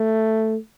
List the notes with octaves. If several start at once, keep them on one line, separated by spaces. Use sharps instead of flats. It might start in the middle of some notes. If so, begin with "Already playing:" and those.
Already playing: A3